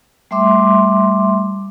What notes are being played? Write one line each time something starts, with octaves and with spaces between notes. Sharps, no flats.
G3 A3 E5 C6 D6